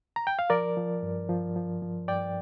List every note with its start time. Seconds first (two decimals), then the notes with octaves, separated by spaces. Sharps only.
0.16 A#5
0.27 G5
0.39 F5
0.50 F3 A#4 D5
0.77 F3
1.03 G2
1.29 F3
1.56 F3
1.82 F3
2.08 G2 D5 G5